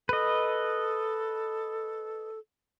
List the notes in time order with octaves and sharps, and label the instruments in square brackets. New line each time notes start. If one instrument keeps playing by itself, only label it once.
[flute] A4 [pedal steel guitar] B4 D#5